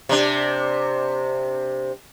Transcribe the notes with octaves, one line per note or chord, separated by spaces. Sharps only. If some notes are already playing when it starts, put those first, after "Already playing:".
C3 D4